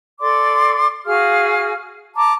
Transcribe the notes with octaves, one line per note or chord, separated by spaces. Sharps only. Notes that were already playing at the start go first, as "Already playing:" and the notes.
A4 D5 C6 D6
F#4 G#4 F5 F6
A5 A#5 D6